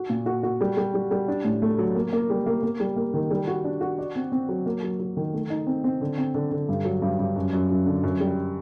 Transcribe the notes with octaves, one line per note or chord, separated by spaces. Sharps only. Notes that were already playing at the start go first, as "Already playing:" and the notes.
Already playing: F#4
A#2
F#4
F#4
G3
G3
G3
G3
D4
A2
A3
F#3
A#3
A#3
G3
A#3
A#3
G3
A#3
D#3
G3
F#4
D4
F#4
D5
C4
C4
F#3
A#3
F#3
F#3
D#3
A3
D#4
C4
C4
D3
C4
D3
D3
G2
F#3
G2
G2
F#2
F#2
F#2
D3
F#2
G3